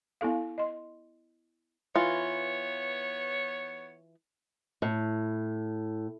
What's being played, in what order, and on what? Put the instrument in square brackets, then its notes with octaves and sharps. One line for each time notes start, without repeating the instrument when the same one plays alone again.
[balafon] B3 E4 A4 F5
D#5 C6
[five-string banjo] E3 F4 [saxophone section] B3 C#5
[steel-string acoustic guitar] A2